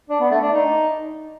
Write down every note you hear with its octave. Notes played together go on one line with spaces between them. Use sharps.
D4
B3
A3
D4
D#4